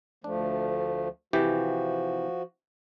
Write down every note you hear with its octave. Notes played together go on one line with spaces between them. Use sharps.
D2 F3 A3 D4
C3 E3 F3 F#4 G4